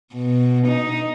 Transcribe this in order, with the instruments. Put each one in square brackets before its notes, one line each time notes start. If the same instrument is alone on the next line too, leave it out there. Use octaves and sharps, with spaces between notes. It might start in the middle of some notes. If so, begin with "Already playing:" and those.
[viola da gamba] B2
D#4